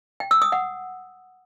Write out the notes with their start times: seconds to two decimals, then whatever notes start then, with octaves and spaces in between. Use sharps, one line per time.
0.20 G5
0.31 E6
0.42 D#6
0.52 F#5